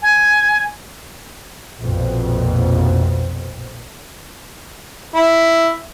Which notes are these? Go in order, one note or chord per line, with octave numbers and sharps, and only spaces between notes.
G#5
A#1 F2 B2
E4